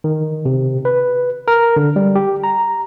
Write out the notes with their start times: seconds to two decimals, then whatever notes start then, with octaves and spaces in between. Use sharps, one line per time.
0.04 D#3
0.46 C3
0.85 B4
1.48 A#4
1.76 D3
1.96 G3
2.15 G4
2.44 A#5